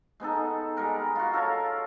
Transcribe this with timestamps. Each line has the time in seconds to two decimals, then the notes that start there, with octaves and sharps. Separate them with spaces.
0.20 G#3 B3 D#4 A4
0.77 G3 G#3 A#4 B4
1.15 F4 F#4
1.33 A4 A#4 C#5 F5